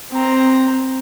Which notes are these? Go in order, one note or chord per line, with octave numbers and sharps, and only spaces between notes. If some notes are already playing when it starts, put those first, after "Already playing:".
C4 A#5